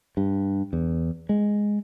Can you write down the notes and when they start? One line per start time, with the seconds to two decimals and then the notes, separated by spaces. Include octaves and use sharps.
0.17 G2
0.73 E2
1.29 G#3